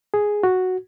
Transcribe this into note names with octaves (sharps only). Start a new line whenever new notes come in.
G#4
F#4